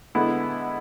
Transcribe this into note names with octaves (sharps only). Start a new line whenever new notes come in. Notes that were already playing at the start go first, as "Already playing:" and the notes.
D3 G#3 B3 E4